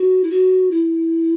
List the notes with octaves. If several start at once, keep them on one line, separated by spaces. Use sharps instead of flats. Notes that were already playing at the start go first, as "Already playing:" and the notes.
Already playing: F#4
E4
F#4
E4